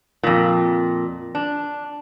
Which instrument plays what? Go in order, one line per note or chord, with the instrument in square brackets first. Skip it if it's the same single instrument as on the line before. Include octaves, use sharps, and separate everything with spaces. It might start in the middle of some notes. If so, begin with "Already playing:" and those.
[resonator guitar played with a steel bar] F2 A#2
D4